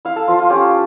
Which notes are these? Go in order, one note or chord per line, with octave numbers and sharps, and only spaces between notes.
E4 F5
A4
F3 F4
F4
C#4 G4